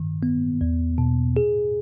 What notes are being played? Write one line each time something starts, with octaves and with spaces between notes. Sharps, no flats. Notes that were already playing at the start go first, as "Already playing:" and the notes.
Already playing: G2 D#3
B3
E2
B2
G#4